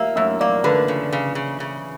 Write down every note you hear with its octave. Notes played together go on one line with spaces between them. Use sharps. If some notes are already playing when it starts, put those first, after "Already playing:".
Already playing: A#3 E5 E6
F#2 E5 E6
A#3 D5 D6
D3 B4 B5
C#3
C#3
C#3
C#3